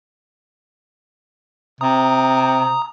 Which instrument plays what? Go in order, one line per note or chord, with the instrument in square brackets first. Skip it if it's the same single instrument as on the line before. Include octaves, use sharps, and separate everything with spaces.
[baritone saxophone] C3 [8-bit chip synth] A#5 D#6